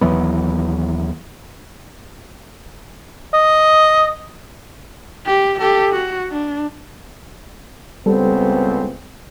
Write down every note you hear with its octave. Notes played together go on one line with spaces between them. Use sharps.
D#2 E3 F#3 B3
D#5
G4
G4 A4
F#4
D4
C#2 G3 B3 C4 A4